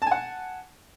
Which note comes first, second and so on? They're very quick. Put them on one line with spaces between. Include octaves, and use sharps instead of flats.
A5 G#5 F#5